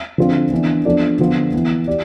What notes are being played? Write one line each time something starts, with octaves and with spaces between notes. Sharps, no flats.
D3 F3 C4 F4
E3 B3 D4
F3 B3 D4 A4 D5
D3 F3 B3 F4
E3 B3 E4
G4 D5